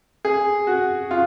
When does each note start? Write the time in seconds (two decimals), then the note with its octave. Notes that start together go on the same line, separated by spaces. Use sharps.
0.25 G#4
0.67 F#4
1.11 F4